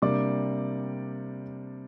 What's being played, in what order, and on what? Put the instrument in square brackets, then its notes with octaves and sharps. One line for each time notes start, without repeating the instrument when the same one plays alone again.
[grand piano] C3 G3 A#3 D4 D5 D6